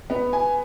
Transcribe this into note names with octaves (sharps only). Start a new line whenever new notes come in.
B3
G#5